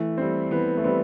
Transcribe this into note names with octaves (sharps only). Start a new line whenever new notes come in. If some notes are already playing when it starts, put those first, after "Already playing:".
Already playing: E3 A3
G3 C4
E3 B3
A3
G3 B3 C4